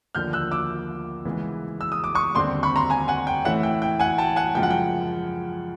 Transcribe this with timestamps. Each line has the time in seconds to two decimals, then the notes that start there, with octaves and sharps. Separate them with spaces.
0.15 D#2 D3 F3 A#3 F6 G6
0.33 E6 F#6
0.51 D6 E6
1.25 C#3 E3 G#3 B3
1.81 E6
1.92 D#6
2.04 D6
2.15 C#6 D#6
2.35 D#2 D3 G3 C4 C6 D6
2.63 B5 C#6
2.76 A#5 C6
2.90 G#5 A#5
3.08 F#5 G#5
3.27 G5
3.45 A2 E3 A3 C#4 E4 F#5
3.63 G5
3.82 G5
3.99 F#5 G#5
4.18 G5 A5
4.36 F#5 G#5
4.55 F#2 C#3 F3 G#3 G5
4.63 F#5
4.70 G5